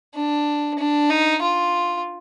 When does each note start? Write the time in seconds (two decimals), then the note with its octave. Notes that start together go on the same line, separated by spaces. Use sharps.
0.15 D4
0.78 D4
1.10 D#4
1.42 F4